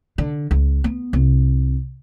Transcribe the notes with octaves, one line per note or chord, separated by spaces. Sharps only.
D3
C#2
B3
C2